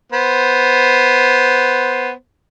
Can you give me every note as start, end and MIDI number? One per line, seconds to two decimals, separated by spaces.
0.12 2.11 59
0.12 2.11 72